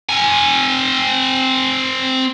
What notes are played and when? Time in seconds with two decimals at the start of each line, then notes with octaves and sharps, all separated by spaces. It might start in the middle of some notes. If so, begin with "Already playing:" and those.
0.09 C4 G#5